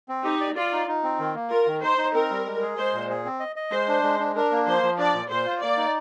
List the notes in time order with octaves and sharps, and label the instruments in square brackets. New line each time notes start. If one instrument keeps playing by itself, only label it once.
[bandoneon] C4
[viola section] D#4 [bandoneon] G4
[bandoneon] D5
[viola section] F4 [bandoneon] D5
[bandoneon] D#4
D#4
C4
D#3
A#3
[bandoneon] F4 [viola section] A#4
[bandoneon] D#3
[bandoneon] D#4 [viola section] C5
[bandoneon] D#4
[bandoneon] C4 [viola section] A#4
[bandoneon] G3
G#3
G#4
[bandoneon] G#3 [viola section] C5
[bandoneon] A#2
G#4
C4
D#5
D#5
[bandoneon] G#3 [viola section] C5
[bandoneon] D4
G#3
D4
[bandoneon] D4 [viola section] A#4
[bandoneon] A#3
[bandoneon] F3 [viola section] C5
[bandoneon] F3
[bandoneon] D4 [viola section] D5
[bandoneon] A#2
[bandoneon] A#2 [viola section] C5
[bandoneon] F4
[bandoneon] A#3 [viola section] D5
[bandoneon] D#4